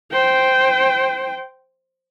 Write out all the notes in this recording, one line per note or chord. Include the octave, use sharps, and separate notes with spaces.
C5 G5